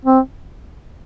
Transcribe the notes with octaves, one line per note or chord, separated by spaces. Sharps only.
C4